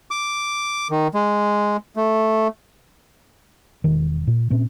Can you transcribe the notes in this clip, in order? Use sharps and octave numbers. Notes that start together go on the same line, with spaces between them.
D6
D#3
G#3
A3
E1 D#3
A#2
A#2 C4 C#4